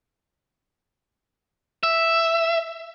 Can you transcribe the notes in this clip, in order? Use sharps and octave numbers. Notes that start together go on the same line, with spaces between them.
E5